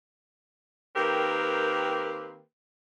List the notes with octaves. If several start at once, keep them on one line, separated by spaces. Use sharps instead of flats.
D#3 A#3 C4 G4 A#4 B4